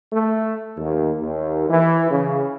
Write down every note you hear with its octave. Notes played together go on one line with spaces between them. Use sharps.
A3
D#2
D#2
E3
C#3